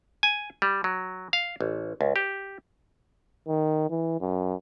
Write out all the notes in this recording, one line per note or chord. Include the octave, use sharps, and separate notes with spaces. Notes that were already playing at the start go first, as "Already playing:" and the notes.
G#5
G3
F#3
F5
A1
C#2
G4
D#3
E3
F#2